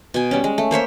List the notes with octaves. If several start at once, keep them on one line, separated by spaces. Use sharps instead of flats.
B2 G#5
G3 C#4
G#3
A3
A#3 C5 C#5 E5